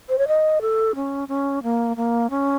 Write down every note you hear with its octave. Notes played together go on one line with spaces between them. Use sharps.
C5
C#5
D#5
A4
C#4
C#4
A#3
A#3
C#4